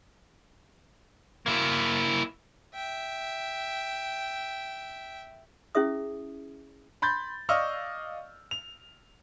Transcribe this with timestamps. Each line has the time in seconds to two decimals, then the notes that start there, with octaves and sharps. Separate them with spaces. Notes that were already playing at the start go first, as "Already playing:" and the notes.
1.46 A#3 E4
2.75 E5 G5
5.75 C#4 E4 G#4 E5 D#6
7.02 B5 C6 G6 A6
7.49 D5 D#5 F5 C#6 E6 F6
8.51 F7